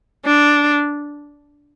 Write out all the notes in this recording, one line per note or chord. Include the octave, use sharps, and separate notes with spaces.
D4